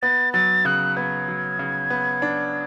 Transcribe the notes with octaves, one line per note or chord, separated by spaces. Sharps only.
B3 A6
F#3 A6
C#3 F#6
B3 G#6
F#3
C#3
B3
D4